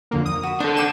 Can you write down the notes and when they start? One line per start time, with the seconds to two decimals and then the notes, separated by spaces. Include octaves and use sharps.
0.11 F2 D3 A#3
0.26 D#6
0.43 F#4 B5
0.60 D4 A4 C5 F#5
0.77 C5 G5 D6 E7